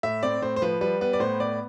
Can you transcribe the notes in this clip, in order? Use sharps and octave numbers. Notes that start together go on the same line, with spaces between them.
A2 E5
C4 D5
A2 C5
C5
F3 B4
G3 B4
B3 B4
D5
A2 C5
B3 D5